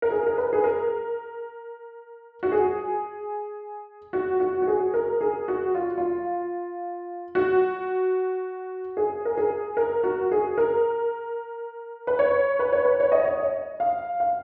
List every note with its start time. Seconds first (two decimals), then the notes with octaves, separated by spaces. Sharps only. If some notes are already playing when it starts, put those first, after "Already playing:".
0.02 A#4
0.11 G#4
0.27 A#4
0.38 B4
0.53 G#4
0.64 A#4
2.43 F#4
2.52 G#4
4.13 F#4
4.40 F#4
4.62 F#4
4.67 G#4
4.94 A#4
5.21 G#4
5.48 F#4
5.75 F4
5.98 F4
7.35 F#4
8.97 G#4
9.25 A#4
9.37 G#4
9.77 A#4
10.04 F#4
10.32 G#4
10.58 A#4
12.07 B4
12.19 C#5
12.59 B4
12.73 C#5
12.85 B4
13.00 C#5
13.12 D#5
13.25 C#5
13.40 D#5
13.80 F5
14.20 F5